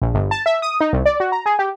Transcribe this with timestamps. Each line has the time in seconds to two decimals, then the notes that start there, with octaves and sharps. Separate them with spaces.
0.02 A#1
0.14 G1
0.31 A5
0.46 E5
0.62 D#6
0.81 D#4
0.93 C2
1.06 D5
1.20 F#4
1.32 A#5
1.46 G#4
1.59 G4